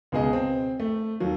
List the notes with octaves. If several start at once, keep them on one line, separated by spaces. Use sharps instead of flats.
C#2 B2 G#4 D#5
C4
A3
D#2 F#3